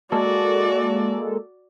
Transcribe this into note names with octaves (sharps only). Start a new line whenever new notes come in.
G#3 A#3 F#4 A4 D5